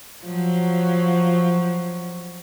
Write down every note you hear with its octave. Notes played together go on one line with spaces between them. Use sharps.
F3 F#3